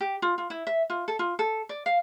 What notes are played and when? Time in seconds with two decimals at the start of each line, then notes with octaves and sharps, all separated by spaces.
0.01 G4
0.22 F4
0.38 F4
0.50 E4
0.67 E5
0.90 F4
1.08 A4
1.19 F4
1.39 A4
1.69 D5
1.86 F5